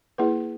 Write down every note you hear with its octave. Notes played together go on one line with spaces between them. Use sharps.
A#3 E4 G#4 B4